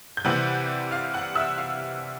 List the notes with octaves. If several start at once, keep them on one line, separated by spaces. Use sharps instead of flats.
G6
C3 E3 G3 C4 F#5 F#6
F5 F6
F#5 F#6
E5 E6
F5 F6